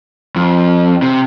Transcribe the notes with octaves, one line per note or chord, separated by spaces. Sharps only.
F2
C3